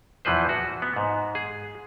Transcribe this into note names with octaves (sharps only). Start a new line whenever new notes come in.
E2 E3 F3 B4 C5
F#4
B3
G#2
G#4